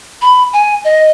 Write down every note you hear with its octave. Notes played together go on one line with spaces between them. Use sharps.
B5
G#5
D#5